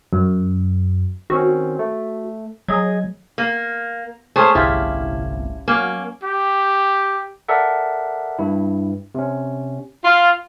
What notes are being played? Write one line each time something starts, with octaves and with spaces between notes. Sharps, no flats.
F#2
D#3 C4 C#4 F#4
A3
F#3 G#4 D#5 G#6
A#3
A3 C#4 G#4 C5
G1 C2 A2 E4 F4 G4
F#3 A#3 C#4
G4
A4 A#4 D5 E5 F#5
G2 E4
C3 C#4
F4